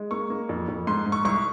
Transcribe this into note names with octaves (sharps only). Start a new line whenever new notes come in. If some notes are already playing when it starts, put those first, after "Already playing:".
Already playing: G#3
A#3 C#6
A#3
F2
F2
G#2 C6
G#2
C#6
C2 C#6